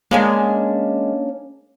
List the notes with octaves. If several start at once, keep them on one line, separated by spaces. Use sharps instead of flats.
G#3 A#3 C#4 D4